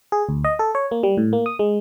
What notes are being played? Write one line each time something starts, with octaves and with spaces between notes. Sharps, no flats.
G#4
D2
D#5
A4
C#5
A#3
G3
A2
A#3
D#6
G#3